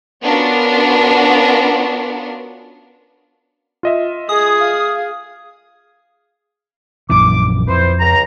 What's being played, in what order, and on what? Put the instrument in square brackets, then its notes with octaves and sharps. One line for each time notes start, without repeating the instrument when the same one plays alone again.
[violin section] B3 C#4 D4 F4 F#4 A#4
[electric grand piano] F4 D#5 E5
[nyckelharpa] G#4 [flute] G#5 [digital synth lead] D#6
[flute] F5
[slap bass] A#1 F#2 E3 [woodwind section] D6
[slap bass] F2 [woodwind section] E4 B4 C5
[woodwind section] C#2 A#5